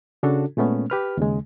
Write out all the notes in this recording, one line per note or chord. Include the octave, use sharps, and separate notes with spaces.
C#3 D4 F#4 A4
A#2 G#3 A3 B3 C#4
G4 B4 F6
D#2 C#3 G#3